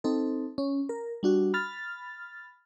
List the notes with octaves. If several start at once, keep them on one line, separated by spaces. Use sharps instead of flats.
C4 D#4 A4
C#4
A#4
G3 D4 F#4
B5 F6 A6